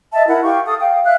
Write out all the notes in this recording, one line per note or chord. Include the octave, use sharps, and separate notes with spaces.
D#5 E5 A5
E4 A#4 F#5
G4 F5 C#6
A4 F5 D#6
F5 G5
E5 F5 F#6